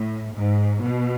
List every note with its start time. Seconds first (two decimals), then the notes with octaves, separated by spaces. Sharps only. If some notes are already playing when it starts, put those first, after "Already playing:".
Already playing: A2
0.35 G#2
0.82 B2